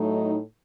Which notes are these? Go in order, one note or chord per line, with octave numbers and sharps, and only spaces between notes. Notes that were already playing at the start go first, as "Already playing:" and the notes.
Already playing: A2 F#3 A3 D#4